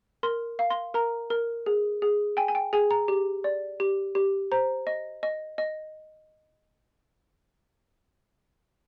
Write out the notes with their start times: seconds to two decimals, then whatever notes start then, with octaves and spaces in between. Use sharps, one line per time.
0.23 A#4 C6
0.59 F5
0.70 C6
0.94 A#4 A#5
1.30 A#4
1.66 G#4
2.02 G#4
2.37 G5 G#5
2.48 G#5
2.55 G5
2.73 G#4 G#5
2.91 A#5
3.08 G4
3.44 D5
3.80 G4
4.15 G4
4.52 C5 A#5
4.87 D#5
5.23 D#5
5.58 D#5